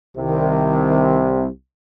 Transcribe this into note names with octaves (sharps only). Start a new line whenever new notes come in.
C2 C3 D#3